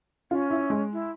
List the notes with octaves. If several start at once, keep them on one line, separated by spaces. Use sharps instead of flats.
C#4 F4
E4
G#3
E4